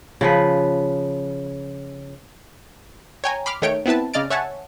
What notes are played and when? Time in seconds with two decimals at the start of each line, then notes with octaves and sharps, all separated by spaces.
0.21 C#3 F3 B4
3.24 C#5 G5 G#5 A#5
3.46 B5 C6 D6 F6
3.62 D#3 A3 C#5 G5 D7
3.86 B3 C4 E4 B4 A5
4.14 C#3 D5 D#5 F6 A6 D7
4.30 C#5 E5 F#5 G#5 A5 C#6